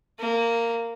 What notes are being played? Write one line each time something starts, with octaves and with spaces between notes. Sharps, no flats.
A#3